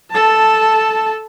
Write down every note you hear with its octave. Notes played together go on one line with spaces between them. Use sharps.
A4 A5